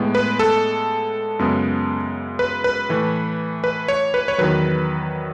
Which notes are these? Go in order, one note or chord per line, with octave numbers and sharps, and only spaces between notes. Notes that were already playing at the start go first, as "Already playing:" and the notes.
Already playing: A2 G#3 B3
B4
A4
F#2 C#3 G#3 B3
B4
B4
A2 E3 A3
B4
C#5
B4
C#5
E2 D#3 F#3 B4